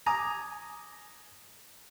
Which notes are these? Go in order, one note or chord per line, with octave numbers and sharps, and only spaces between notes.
G#5 A#5 D6 D#6